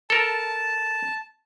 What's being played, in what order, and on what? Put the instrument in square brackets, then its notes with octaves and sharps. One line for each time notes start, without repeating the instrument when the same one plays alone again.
[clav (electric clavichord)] A4 A#4 [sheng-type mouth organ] A5